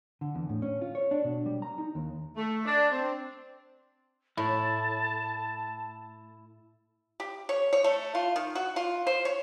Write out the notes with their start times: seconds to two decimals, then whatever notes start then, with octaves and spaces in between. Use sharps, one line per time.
0.21 D3
0.35 E2
0.49 A2
0.62 C#4
0.81 F4
0.95 C#5
1.11 D4
1.24 B2
1.46 G3
1.62 A#5
1.78 D#4
1.95 D#2
2.36 A3
2.66 D4
2.90 C4
4.37 A2 E4 A5
7.20 G4
7.49 C#5
7.73 C#5
7.84 A3
8.15 F4
8.36 D#3
8.55 F#4
8.76 F4
9.07 C5
9.25 C#5